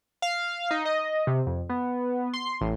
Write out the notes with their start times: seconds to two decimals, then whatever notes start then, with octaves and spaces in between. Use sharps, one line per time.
0.22 F5
0.71 D#4
0.85 D#5
1.27 C3
1.47 F2
1.69 B3
2.33 C6
2.61 A1